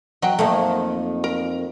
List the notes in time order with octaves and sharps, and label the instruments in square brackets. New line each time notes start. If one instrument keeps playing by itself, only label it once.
[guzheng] F#3 [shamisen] D#5 F#5 G5
[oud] F2 D#3 A#3 [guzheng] A3
[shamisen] A#4